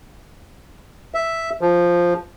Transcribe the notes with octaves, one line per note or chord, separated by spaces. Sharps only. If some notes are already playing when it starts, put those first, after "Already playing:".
E5
F3